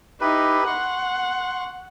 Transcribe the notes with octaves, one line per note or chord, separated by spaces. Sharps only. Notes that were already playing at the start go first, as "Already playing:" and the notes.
D#4 E4 G4 B4
F#5 C6 C#6